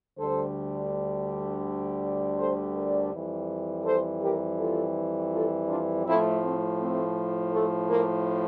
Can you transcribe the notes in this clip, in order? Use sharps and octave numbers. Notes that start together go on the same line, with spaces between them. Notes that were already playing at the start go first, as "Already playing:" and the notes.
D2 D3 G3 A4 C5
A4 C5
A#4 D5
F2 E3 G3
A4 C5
G4 A#4
F4 A4
F4 A4
D4 F4
A2 F3 A3 C4 E4
A3 C4
A3 C4
A3
A#3